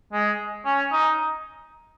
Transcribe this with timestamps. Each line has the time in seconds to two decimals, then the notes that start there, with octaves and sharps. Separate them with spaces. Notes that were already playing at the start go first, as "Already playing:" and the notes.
0.13 G#3
0.65 C#4
0.92 D#4